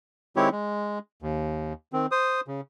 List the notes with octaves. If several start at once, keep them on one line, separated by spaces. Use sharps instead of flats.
D#3 G#3 C4 E4 G4 C#5
G#3
D#2
D#3 C4
C5 D#6
C#3